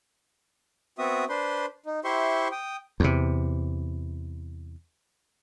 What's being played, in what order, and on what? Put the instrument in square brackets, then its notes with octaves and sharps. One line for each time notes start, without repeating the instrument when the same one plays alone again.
[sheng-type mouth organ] B3 C4 F#4 E5 D#6
D4 B4 C5 C6
D#4
E4 G4 C5 E5 C6 C#6
G5 D#6
[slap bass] E2 C3